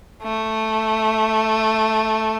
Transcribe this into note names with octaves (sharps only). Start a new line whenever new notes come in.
A3